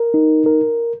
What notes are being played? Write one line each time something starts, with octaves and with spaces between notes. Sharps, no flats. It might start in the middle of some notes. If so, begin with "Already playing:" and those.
Already playing: A#4
D#4
A#4